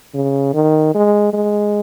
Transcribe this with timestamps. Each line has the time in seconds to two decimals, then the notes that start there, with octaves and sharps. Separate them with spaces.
0.15 C#3
0.54 D#3
0.94 G#3
1.34 G#3